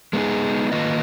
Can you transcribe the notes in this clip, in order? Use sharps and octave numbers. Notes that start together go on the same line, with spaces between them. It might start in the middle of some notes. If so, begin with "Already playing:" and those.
G#3 B3 D#4 G#4
D#3 A#3 F4 B4 D#5